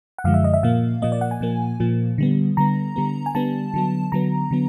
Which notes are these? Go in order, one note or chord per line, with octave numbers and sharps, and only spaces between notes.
F#5
F#2 D3 F3 G#3 F5
E5
D#5
E5
A#2 F3 A#3 F5
A#2 F3 A#3 D#5
D5
F#5
G#5
A#2 F3 A#3
A#2 F3 A#3
D3 G3 B3
D3 G3 B3 A#5
D3 G3 B3
G#5
D3 G3 B3 A5
D3 F#3 B3
D3 F#3 B3 A#5
D3 F#3 B3